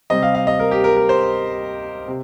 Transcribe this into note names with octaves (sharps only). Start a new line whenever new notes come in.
C3 G3 C4 D#5
F5
F5
D#5
A#4
G4
A#4
A#4
C5
C3